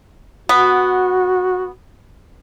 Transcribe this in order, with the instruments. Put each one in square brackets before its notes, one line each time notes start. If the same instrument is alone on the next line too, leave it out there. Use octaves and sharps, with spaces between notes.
[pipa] B3 [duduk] F#4